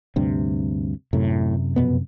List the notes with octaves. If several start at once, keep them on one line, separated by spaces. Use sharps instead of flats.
D2 G2 C3
F#2 A2 C3
F2 B2 B3